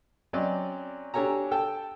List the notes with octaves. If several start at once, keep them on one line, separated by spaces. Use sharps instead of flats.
F#3 C4 C#4 D5 D#5
D4 G4 A4 C#5 G#5 A#5
A4 G5 A5